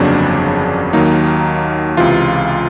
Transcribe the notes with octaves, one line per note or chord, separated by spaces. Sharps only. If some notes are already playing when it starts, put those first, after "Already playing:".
Already playing: G1 F2 C#3 F#3 A#3 D4
D#2 D#3 F#3 A#3 D#4
C#2 C3 E3 F4